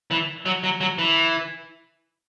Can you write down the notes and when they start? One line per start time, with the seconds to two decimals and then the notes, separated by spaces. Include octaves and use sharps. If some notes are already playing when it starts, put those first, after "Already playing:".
0.11 E3
0.46 F#3
0.63 F#3
0.81 F#3
0.98 E3